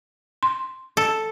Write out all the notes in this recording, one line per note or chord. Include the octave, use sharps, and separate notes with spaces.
C6
A4